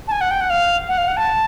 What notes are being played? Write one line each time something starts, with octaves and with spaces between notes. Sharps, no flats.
A5
G#5
F#5
G5
F#5
F5
F#5
F5
F#5
A5